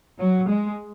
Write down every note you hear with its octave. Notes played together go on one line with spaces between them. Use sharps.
F#3
G#3